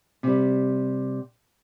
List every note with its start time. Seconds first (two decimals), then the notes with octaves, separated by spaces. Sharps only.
0.23 C3 G3